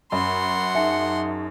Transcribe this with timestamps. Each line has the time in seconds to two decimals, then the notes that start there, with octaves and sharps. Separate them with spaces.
0.12 F#2 F#5 B5 C6
0.75 D#4 G#4 E5 G#5 A5 C#7